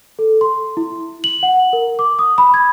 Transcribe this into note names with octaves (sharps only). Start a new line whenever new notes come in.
A4
C6
E4
F#7
F#5
A#4
D6
D#6
B5
G#6